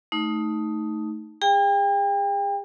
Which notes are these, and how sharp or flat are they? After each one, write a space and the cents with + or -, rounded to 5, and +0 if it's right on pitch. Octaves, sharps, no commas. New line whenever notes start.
A3 +0 D#4 +10
G#4 -40 G5 +30